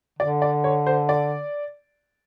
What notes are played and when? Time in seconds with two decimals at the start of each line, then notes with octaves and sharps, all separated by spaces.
0.19 D3 D5
0.42 D5
0.64 C#5
0.87 C5
1.09 D5